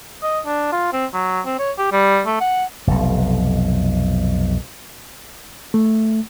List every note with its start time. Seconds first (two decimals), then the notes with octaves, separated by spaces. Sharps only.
0.23 D#5
0.46 D4
0.72 F4
0.93 C4
1.13 F#3
1.46 C4
1.59 C#5
1.78 G4
1.92 G3
2.26 A3
2.40 F#5
2.87 F1 B1
5.74 A3